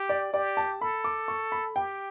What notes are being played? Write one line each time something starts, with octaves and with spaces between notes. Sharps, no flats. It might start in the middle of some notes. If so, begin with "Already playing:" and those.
Already playing: G4
D5
G4 D5
A5
A4 B5
D6
C#6
B5
G4 G5